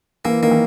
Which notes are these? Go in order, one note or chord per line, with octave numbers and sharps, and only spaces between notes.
E3 A#3
D#3 A#3
E3